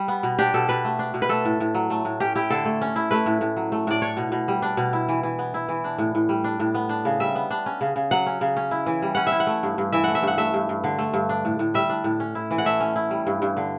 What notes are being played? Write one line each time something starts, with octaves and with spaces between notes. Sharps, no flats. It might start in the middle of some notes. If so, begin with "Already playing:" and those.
Already playing: G3
B3
B2
D4 G4
B2 A4
B2 B4
A3
D4
B2
B4
A3 A4
A2
A2
F#3
A3
A2
C#4 G4
E4 G4
D3 A4
A3
C#4
E4
A3 B4
A2
A2
F#3
A3
A2 D5
D4 C#5
B2
B2
G3
D4
B2
E4
E3
E3
B3
E4
E3
D4
A2
A2
G3
D4
A2
B3
D4
C#3
G3 E5
B3
D4
C#4
C#3
C#3
F#3 F#5
C#4
C#3
C#4
E4
E3
G3
C#4 F#5
E5
E4
F#5
A3
G2
G2
E3 E5
A3 F#5
E5
G2 F#5
A3 E5
G2
G2
D3
A3
G2
D4
A2
A2
G3 E5
D4
A2
C#4
E4
E3
F#5
A3 E5
C#4
E4
G3
G2
G2
D3